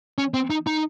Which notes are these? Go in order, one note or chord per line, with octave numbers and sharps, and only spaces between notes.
C#4
C4
D#4
D#4